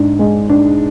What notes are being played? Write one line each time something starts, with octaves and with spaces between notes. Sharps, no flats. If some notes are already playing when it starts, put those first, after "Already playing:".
Already playing: G#2 D4
G#3
D4